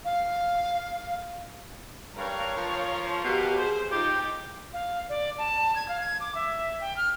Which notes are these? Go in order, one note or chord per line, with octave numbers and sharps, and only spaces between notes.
F5
G2 A#4 C#5 F5
F3
B2 G4 A#4 F5
G#4 C5
D#4 F4 G4 G5
F5
D5
A5
G#6
F5
G#6
D6
E5
G5
F6